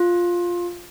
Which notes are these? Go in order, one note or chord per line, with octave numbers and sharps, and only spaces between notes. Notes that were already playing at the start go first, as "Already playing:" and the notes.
Already playing: F4